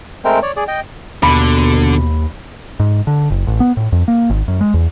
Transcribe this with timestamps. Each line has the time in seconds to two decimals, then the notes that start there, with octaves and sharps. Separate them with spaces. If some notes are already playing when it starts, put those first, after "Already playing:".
0.25 G#3 A3 C4 A#4 G5
0.43 C#5 D5
0.56 G#4 D5
0.68 D#5 G5
1.23 D#2 B2 D3 B5
2.80 G#2
3.07 D3
3.31 F#1
3.47 A1
3.60 B3
3.77 A2
3.92 F2
4.08 A#3
4.30 G#1
4.48 F#2
4.61 G#3
4.74 E2